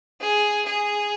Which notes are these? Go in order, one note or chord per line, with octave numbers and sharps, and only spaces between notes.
G#4
G#4